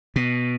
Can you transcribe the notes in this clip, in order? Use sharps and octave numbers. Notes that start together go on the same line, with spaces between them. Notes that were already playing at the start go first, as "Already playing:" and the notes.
B2